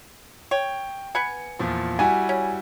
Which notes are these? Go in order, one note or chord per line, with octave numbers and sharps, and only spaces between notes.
C#5 G5
B3 B4 G#5 C#7
E2 A#2 F3
G3 E4 F#4 G#5
C#4